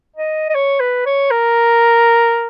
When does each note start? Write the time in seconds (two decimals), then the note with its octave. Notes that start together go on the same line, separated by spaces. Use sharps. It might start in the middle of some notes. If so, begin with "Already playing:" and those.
0.16 D#5
0.49 D#5
0.55 C#5
0.80 B4
1.06 C#5
1.31 A#4